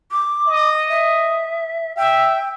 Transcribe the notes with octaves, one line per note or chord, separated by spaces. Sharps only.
D6
D#5
E5
E5 G5